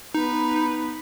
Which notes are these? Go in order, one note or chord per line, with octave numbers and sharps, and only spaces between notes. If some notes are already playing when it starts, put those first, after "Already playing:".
B3 D#4 B4